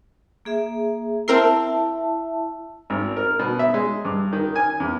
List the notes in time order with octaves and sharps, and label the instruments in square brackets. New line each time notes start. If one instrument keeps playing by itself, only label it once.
[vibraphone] A#3 G#4 E5
[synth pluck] C4 A#4 C7 [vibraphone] E4 E5 A5
[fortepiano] G#1
A#4
B2
E5
G#3
G2
D#3
G#5
E2